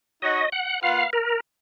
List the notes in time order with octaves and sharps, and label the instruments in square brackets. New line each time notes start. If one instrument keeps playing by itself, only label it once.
[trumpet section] D#4 F#4 C#5 F#5 [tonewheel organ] D#5
[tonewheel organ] F#5
[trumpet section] A#3 F4 B4 F#5 [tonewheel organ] F5
[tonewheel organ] A#4